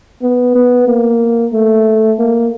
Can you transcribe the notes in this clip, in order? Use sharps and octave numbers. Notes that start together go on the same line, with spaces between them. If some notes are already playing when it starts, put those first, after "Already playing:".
B3
B3
A#3
A3
A#3